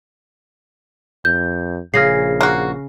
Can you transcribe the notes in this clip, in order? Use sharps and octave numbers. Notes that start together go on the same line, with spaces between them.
F2 G6
A#1 C#3 G#4 F6 A#6 C7
A#3 F#4